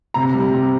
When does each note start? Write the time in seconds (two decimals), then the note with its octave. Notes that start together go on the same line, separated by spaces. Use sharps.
0.14 C3 A#5
0.34 G3
0.54 C3